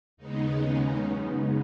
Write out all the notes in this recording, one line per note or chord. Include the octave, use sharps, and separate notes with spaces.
D#2 C#3 G#3 B3 D#4
C#4
F#2 C#3 G#3 B3 D#4